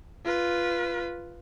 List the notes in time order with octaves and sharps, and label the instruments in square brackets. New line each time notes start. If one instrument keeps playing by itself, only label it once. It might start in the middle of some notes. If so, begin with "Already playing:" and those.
[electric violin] F4 B4